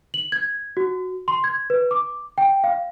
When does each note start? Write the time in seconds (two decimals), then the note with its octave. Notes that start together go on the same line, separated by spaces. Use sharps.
0.14 F#7
0.32 G#6
0.77 F#4
1.28 C6
1.44 G#6
1.70 B4
1.91 D6
2.38 G5
2.64 F5